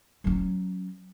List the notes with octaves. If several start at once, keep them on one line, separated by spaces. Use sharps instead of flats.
F#3 C#4